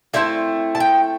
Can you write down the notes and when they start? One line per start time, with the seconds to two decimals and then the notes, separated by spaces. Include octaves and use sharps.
0.13 D3 A3 C4 E4 E5
0.75 A5
0.80 G5